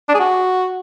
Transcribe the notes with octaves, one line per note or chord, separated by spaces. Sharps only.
D4
G#4
F#4